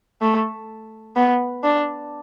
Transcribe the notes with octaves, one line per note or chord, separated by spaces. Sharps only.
A3
B3
D4